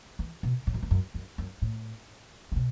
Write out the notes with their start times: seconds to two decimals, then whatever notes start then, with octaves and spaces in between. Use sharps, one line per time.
0.19 E3
0.43 B2
0.67 A2
0.74 F#2
0.83 E2
0.91 F#2
1.14 F#2
1.38 F#2
1.62 A2
2.52 C#3
2.56 B2